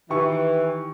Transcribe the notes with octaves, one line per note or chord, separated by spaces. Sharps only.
D#3 E3 G4 C#6